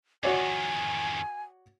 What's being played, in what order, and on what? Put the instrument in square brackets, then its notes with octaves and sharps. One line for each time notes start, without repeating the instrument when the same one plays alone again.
[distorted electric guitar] F2 D#3 [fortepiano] F#4 C#5 D5 [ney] G#5